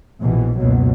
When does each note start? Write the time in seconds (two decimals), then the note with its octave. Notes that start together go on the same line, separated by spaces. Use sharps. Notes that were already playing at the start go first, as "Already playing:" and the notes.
0.21 A#1 B2 E3
0.60 F#1 C#2 B2 F#3